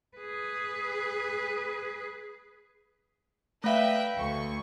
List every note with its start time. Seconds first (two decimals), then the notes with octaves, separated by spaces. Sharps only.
0.17 G#4 B4
3.64 A3 B4 E5 F5 G5
4.17 D2 C#6